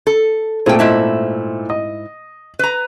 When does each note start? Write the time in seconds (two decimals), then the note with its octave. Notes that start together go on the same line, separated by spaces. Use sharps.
0.07 A4
0.66 A#2 A3 C4 G#4 G5
0.79 G#2 E4 A5
1.70 D#5
2.59 B4 A#5